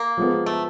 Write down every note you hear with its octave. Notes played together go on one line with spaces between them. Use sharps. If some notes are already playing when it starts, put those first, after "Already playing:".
Already playing: A#3
F3 G#3 B3
A3